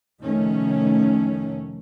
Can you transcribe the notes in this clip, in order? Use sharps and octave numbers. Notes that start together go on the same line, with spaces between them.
F1 D#3 A3 C#4